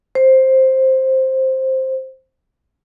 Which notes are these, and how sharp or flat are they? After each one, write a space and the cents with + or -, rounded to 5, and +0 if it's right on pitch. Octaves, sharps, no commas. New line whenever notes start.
C5 +10